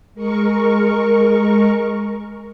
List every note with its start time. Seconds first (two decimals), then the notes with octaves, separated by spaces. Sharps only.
0.14 G#3 A#4 C#6